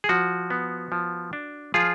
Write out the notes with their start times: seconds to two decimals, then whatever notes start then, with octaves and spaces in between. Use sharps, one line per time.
0.04 G#4
0.09 F3 F#4
0.50 B3
0.92 F3
1.33 D4
1.74 F3 F4 G#4